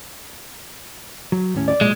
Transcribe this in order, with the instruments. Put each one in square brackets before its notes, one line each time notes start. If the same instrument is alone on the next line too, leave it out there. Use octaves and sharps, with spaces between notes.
[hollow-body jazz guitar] F#3
D#2 A2 C#4
[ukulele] D5
[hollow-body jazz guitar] B1 A#2 [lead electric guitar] G#3